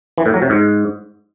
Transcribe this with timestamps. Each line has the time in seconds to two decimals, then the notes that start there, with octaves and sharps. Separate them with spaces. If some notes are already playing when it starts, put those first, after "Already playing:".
0.18 E3
0.26 A2
0.34 F#3
0.42 C3
0.50 G#2